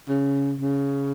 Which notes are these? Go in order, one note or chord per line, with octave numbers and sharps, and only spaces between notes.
C#3
C#3